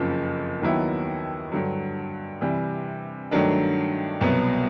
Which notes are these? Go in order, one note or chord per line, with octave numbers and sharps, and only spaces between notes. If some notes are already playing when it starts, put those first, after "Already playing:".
Already playing: F#1 F2 C#3 F3
D#2 D#3 F#3 B3 E4
G2 D3 F#3
C3 E3 G3
G2 D#3 F#3 A3 D4
C2 B2 F#3 B3